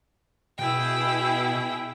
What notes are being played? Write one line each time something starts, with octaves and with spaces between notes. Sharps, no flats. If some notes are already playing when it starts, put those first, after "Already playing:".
B2 E4 G#4 G5